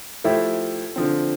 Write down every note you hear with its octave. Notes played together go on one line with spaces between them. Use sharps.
F3 A3 E4 G4
D3 F3 C4